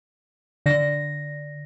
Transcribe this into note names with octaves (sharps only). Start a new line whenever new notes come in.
D3 A#6